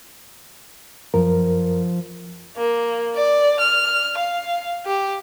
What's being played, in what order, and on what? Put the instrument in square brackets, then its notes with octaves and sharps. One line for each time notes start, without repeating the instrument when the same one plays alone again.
[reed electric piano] F#2 A#4 [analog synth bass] F3
[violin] A#3
D5
F6
F5
G4